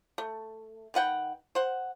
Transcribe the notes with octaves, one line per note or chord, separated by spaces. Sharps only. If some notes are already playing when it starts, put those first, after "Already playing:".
A3
D#3 B4 F#5 G5
C5 F#5